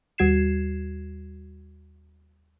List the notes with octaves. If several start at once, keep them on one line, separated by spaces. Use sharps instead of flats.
D#2 G3 F#4 G#6 C7 E7